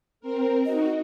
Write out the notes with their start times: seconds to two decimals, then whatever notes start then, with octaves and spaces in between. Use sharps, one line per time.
0.20 C4 A#4
0.66 D#4 F#4 D#5